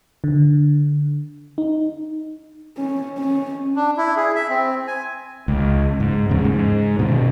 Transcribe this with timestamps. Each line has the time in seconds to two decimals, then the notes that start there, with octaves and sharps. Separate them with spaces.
0.24 D3
1.58 D#4
2.77 C#4
3.18 C#4
3.76 D4
3.97 E4
4.16 G#4
4.35 E5
4.49 C4
4.87 G#5
5.48 C#2
6.00 G#2
6.29 E2 C#3
6.45 G#2
6.99 B2 D#3